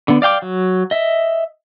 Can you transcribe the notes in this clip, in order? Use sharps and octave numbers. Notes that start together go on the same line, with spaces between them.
D3 B3
D5 F5 G5 D6
F#3
D#5 E5